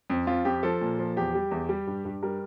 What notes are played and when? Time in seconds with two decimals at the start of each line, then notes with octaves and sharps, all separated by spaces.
0.10 F2
0.27 F2 F4
0.45 F2 G4
0.63 F3 A4
0.81 A#2
0.99 F3
1.16 E2 G4
1.35 G3
1.51 E2
1.69 G3
1.87 G2
2.05 G2
2.23 G3 A#4